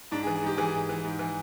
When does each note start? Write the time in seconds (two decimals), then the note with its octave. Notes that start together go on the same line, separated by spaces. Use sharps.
0.11 G#2 D4
0.23 G#4
0.27 E3
0.35 G#4
0.43 G#2 G4
0.58 E3 G#4
0.74 G#2
0.89 E3
1.04 G#2
1.19 E3